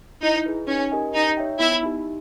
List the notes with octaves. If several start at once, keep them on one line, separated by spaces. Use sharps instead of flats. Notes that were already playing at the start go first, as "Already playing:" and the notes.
D#4 E4
G#4 B4
C#4 D#4
G4 A#4 D#5 G#5
D#4 G4
C#5 E5 G5
B3 E4
D#4 G4